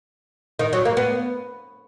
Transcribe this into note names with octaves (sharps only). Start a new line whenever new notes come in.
D#3
F#3
A#3
B3